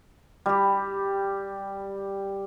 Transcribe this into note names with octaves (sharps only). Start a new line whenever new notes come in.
G3 G4